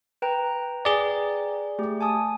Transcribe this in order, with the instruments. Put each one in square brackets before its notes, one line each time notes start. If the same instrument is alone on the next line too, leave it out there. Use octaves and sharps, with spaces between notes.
[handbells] B4 G5 A#5
[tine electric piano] G#4 D5
[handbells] A3 G4
G#5 A5 D#6